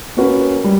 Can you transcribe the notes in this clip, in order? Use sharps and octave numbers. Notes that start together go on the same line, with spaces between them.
A#3 C#4 F#4 B4
G3